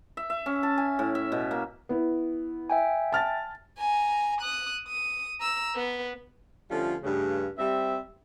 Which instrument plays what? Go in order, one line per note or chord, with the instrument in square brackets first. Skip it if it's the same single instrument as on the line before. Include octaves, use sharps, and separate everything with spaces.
[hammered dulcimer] E5
E5
C#4
A5
G#5
A2
E5
B2
A#3
[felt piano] B3 E4
[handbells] E5 G5 G#5
[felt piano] A5 F6 A6
[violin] G#5 A#5
D#6 F#6
D#6
A#5 E6
B3
[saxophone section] D3 F3 G3 A3 C#4 F4
G2 C#3 A3
G3 C4 E5